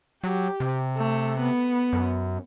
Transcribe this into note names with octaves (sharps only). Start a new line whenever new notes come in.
F#3 G4
C3
A3
B3
F#2